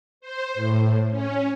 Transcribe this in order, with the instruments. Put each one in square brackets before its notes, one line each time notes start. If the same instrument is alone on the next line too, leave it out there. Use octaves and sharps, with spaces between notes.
[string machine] C5
A2
C#4